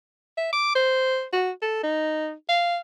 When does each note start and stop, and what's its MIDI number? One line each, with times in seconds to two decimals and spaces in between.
0.37 0.50 76
0.52 0.72 86
0.75 1.24 72
1.33 1.50 66
1.62 1.81 69
1.83 2.32 63
2.49 2.78 77